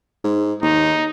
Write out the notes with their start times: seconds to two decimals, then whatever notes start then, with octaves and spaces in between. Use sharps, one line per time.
0.24 G#2
0.62 D#2 D#4